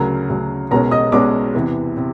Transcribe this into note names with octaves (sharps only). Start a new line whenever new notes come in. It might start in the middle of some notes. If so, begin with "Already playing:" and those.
Already playing: D2 C#3 F#3 A#4 A#5
D2 C#3 F#3
B1 B2 G#3 C#4 A#4 A#5
D#5 D#6
B1 B2 G#3 C#4 D5 D6
E2 C3 E3
C3